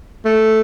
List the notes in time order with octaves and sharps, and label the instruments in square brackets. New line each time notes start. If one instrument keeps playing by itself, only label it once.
[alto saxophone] A3